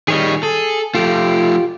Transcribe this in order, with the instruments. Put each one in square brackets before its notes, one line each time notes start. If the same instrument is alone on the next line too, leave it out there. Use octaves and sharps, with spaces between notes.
[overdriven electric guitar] D#3 G3 [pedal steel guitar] G#4 C#5 D#5
[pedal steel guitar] G#4 [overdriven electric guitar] A4
[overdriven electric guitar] F3 A3 [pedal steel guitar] F4 G4